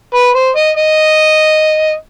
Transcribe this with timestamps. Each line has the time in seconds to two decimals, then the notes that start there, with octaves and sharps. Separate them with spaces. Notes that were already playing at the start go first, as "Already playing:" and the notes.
0.15 B4
0.35 C5
0.56 D#5
0.77 D#5